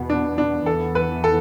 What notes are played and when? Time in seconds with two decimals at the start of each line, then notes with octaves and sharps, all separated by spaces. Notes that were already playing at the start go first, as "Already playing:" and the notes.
Already playing: E2 B2 B3
0.10 D4
0.38 D4
0.66 E2 E3 B3 A4
0.95 B4
1.24 A4